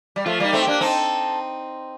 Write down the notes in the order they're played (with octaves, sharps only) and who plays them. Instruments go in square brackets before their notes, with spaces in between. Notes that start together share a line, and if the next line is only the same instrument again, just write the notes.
[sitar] G3
[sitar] F3 A3 [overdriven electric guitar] F4
[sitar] G3 A#3 [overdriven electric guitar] D#4
[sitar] A3 C4
[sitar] A#3 D4 [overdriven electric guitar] G4
[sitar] C4 D#4 [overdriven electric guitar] A4